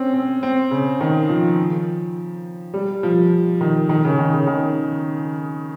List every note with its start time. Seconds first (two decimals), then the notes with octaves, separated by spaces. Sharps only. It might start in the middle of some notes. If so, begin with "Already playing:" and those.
Already playing: C4 C#4
0.14 C4
0.43 C4
0.71 C#3
1.01 D#3
1.29 F3
2.74 G3
3.03 F3
3.61 D#3
3.89 D#3
4.04 C#3
4.19 D#3
4.34 C#3
4.47 D#3